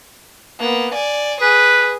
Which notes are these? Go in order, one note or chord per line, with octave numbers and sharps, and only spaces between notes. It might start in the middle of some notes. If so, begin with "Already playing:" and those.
A#3 B3
D5 G#5
G#4 B4